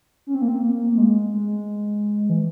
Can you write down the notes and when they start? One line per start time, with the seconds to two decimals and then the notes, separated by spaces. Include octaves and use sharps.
0.27 C#4
0.34 C4
0.41 A#3
0.48 C4
0.62 A#3
0.92 A#3
0.98 G#3
1.33 G#3
2.30 E3